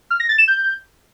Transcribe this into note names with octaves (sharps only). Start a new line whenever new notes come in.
F6
A#6
A6
E7
G6